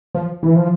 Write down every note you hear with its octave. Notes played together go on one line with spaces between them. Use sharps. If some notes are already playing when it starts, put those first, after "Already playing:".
F3
E3
F3